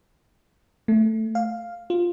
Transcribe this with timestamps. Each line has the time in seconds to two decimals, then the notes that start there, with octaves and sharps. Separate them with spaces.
0.88 A3
1.35 F5
1.90 F4